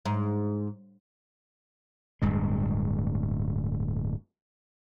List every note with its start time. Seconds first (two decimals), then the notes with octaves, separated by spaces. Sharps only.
0.05 G#2
2.22 D1 G2 G#3